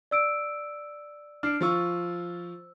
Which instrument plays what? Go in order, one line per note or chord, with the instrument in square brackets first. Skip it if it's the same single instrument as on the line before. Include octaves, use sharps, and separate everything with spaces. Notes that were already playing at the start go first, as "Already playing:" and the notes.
[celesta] D5 E6 D7
[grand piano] D4 [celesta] F6 C7 D7
[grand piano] F3 F4 C#6 [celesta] C5 E6